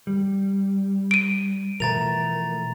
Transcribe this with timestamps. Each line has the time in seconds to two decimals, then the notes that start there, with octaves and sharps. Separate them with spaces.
0.07 G3
1.11 D7 D#7
1.80 B2 E3 F3 A3 A#4 A#5 A6 F7